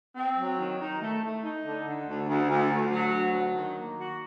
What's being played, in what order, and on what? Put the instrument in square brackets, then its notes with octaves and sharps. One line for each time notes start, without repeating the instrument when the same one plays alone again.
[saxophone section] C4
F#3
D#3
D#4
A3
A3
D#4
D3
D3
D2
D2
D2
D2
F#3
D2
F#3
D#3
A#3
F#4